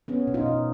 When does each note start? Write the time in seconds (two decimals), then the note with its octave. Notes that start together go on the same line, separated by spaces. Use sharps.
0.08 B3 C#4
0.27 B2
0.34 D#4 F4
0.46 B2